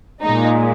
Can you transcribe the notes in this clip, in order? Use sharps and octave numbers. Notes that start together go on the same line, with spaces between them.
A#2 G#3 D#4